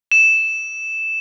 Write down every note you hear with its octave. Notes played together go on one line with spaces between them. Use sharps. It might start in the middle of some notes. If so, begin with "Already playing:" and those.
E7